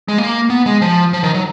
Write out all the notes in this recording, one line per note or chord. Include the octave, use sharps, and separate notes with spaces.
G#3
A#3
B3
G#3
F3
F3
D#3
F#3